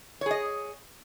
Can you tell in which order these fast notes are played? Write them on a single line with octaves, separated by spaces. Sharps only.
C#5 G#4 D#5